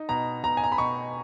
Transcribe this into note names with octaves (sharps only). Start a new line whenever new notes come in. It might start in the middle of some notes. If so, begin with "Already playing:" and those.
Already playing: D#4
B2 A#5
B2 A#5
G#5
A#5
B5
B2 C#6